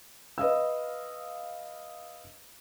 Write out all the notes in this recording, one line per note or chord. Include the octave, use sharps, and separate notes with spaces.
B4 D#5 F5 E6